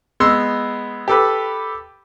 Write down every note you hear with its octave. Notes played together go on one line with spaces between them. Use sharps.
G#3 B3 C6 E6
G4 A4 B4